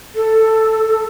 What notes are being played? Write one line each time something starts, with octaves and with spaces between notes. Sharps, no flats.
A4